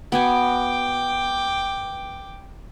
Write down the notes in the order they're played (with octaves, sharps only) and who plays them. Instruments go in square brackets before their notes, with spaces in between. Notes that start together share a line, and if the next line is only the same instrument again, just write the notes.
[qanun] B3 F#4 G#5 [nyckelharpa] G5 D6